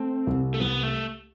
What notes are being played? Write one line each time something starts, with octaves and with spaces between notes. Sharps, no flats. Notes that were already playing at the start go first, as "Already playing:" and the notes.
Already playing: A3 C4
C2
A3
C2 B3
A3